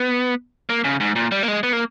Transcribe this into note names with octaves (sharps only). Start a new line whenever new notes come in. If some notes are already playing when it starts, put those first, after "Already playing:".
Already playing: B3
A#3
C#3
G#2
A#2
G3
A#3
G#3
B3
A#3